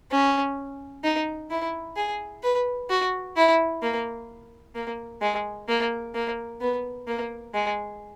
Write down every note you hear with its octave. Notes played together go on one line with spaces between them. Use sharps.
C#4
D#4
E4
G#4
B4
F#4
E4
A#3
A#3
G#3
A#3
A#3
B3
A#3
G#3